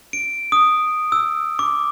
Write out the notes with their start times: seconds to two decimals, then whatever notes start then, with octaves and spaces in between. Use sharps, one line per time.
0.13 D7
0.52 D#6
1.12 E6
1.59 D6